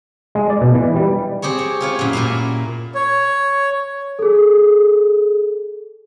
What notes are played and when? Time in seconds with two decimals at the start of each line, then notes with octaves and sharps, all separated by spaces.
0.35 G#3
0.50 D5
0.61 B2
0.74 E3
0.95 G3
1.42 C4 G4 G#4 C#5
1.58 C#5
1.80 E4 F4 C#5
1.99 F#2 A#2
2.13 A#2 E4 F5
2.95 C#5
4.19 G#4 A4